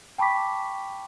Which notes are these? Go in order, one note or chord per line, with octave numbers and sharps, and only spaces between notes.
G5 A5 B5 C#6 D6 B6